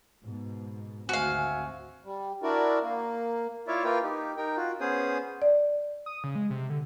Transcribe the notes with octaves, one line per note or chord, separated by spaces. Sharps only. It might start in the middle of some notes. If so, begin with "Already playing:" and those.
G#2 B2
G#1 D2 C4 F#4 E5 F5 G#5
G3
D4 E4 F#4 A#4 D5
A#3
E4 F4 C#5 D5 E5 F5
A#3 F4 A#4 B4 F5 G5
D#4 G4
D#4 A#4 G5
F4 F#4
B3 C#4 G#4 C5 D#6
D5
D#6
C#3
G#3
C3
D3